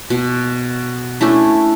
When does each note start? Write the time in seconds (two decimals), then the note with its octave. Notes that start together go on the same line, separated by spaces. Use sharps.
0.10 B2
1.21 A3 C#4 D4 E4